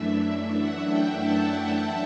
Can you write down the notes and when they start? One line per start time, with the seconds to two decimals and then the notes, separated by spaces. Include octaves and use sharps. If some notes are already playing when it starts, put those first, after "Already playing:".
Already playing: F#2 E3 A3 D4 E5
0.14 E5
0.60 F#5
0.91 G5
1.22 A5